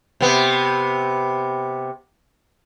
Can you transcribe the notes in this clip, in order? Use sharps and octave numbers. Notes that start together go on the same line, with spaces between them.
C3 B3